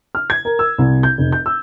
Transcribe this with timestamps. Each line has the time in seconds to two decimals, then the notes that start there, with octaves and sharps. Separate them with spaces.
0.15 F6
0.30 G#6
0.45 A#4
0.59 E6
0.78 C2
1.03 G6
1.18 F1
1.32 G6
1.46 E6